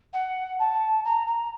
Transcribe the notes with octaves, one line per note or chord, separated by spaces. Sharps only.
F#5
A5
A#5
A#5